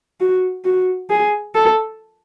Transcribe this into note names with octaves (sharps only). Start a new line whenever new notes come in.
F#4
F#4
G#4
A4